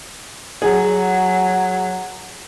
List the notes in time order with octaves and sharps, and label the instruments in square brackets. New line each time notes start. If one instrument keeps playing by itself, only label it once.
[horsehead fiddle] F#3 [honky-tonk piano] G#4